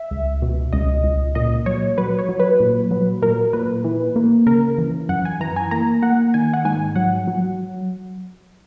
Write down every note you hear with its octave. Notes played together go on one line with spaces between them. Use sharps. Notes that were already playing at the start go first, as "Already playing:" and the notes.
Already playing: E5
C#2
B2
C#2 D#5
C#2
A#2 D#5
F#3 C#5
F#3 B4
C#5
F#3
B4
A#2
F#3
A#2 A#4
A#2 B4
E3
A#3
C#3 A#4
E3
F#2 F#5
G#5
E3 A#5
G#5
A#3 A#5
A#3 F#5
D#3 G#5
F#5
G#2 G#5
F#3 F#5
F#3